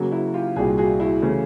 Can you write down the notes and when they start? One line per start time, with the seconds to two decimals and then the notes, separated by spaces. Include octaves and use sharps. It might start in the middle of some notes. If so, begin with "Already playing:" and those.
Already playing: C#3 F#3 A#3
0.12 E4 F#4
0.34 F4 G4
0.56 C2 A#2 G3 F#4 G#4
0.78 F#4 G#4
1.00 E4 F#4
1.22 C#3 E3 A3 C#4